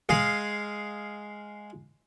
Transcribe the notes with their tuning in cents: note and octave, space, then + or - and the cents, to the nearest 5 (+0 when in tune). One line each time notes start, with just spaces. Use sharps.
G#3 +0 G#4 +0 F5 +0